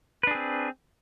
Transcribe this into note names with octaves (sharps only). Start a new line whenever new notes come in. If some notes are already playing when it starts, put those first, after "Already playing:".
C4 D4 G#4 B4